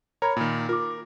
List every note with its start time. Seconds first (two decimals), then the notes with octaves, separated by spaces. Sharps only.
0.22 A#4 C#5 A#5 B5 G#6
0.36 A#2 D#3
0.69 F4 A#4 D6